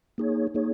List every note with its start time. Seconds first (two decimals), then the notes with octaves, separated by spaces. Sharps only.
0.18 A#3 D#4 G#4 C#5
0.54 A#3 D#4 G#4 C#5